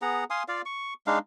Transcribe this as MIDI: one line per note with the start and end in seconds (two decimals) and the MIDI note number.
0.02 0.24 59
0.02 0.24 68
0.02 0.24 78
0.02 0.24 82
0.30 0.43 77
0.30 0.43 80
0.30 0.43 84
0.30 0.43 87
0.48 0.62 65
0.48 0.62 74
0.48 0.62 77
0.66 0.94 85
1.07 1.19 56
1.07 1.19 62
1.07 1.19 63
1.07 1.19 77